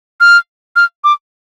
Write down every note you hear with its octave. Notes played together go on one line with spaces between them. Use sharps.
F6
F6
D6